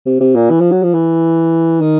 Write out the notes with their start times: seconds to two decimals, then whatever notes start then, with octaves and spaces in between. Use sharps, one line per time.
0.06 C3
0.20 C3
0.35 A#2
0.50 E3
0.61 F3
0.72 F#3
0.83 F3
0.94 E3
1.81 D#3